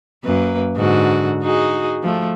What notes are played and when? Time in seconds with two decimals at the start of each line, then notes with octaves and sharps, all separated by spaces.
0.24 F#2 A#3 B4
0.76 G#2 D3 F#4
1.43 D#4 F#4 G#4
2.03 F3 A3